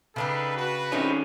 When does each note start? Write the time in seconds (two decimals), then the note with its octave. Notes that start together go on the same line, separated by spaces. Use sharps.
0.16 C#3 D4 D#4 G4 A4 B4
0.55 F#4 B4
0.92 D#3 G#3 C4 C#4 E4